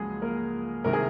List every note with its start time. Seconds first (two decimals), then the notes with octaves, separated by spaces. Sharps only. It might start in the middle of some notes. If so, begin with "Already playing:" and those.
Already playing: C#2 C#3 F3 F#3 G#3 A#3 G#4
0.22 A#3 A#4
0.84 C2 C3 D#3 G#3 A#4
0.93 G#4